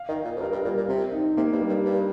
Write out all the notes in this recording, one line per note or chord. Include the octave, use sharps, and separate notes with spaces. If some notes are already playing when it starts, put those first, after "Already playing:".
Already playing: F5
D#3 D#5
A#2
F2
G2 A#4
G2
A#2 G3
A#2
C3 C4
D#4
C3 A#3
G2
G3
G2
G2